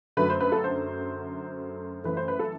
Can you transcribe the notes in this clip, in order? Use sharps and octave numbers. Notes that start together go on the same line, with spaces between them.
F#2 D3 F#3 A3 B4
C5
B4
A4
C5
F#2 E3 A3 B4
C5
B4
A4